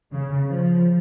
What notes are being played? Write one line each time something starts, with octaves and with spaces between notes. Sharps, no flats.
C#3
F3